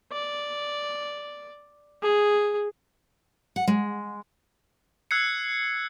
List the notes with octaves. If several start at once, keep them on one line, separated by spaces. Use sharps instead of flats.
D5
G#4
F#5
G#3
E6 F#6 G#6 C7 C#7